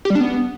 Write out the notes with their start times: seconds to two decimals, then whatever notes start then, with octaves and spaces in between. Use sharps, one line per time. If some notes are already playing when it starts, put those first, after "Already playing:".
0.05 G4
0.10 G3
0.15 D4
0.20 B3